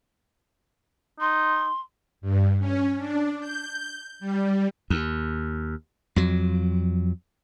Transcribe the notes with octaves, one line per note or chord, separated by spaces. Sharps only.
D#4 C6
G2
C#4
D4
G6
G3
D#2
F2 F#3